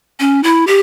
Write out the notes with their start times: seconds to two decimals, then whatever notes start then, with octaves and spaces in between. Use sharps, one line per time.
0.19 C#4
0.43 E4
0.67 G4